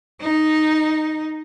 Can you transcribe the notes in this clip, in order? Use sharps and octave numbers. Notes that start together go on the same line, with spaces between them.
D#4